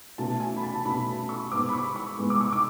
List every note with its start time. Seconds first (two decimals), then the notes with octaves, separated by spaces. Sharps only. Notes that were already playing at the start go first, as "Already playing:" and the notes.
0.18 B2 A3 C#4 A5
0.40 G#5
0.57 B5
0.63 A5
0.74 A5
0.85 B2 A3 C#4 B5
1.29 C#6
1.52 G#2 G#3 B3 D6
1.69 B5
1.73 C#6
1.96 C#6
2.18 G#2 G#3 B3
2.30 D6
2.41 C#6
2.53 D6